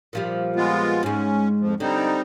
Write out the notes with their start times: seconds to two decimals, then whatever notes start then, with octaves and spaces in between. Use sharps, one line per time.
0.13 A#2 F3 G3
0.56 G#3 B3 F4
1.03 G#2 G#3 C#4
1.60 F2 F3
1.80 D3 G3 C4 D#4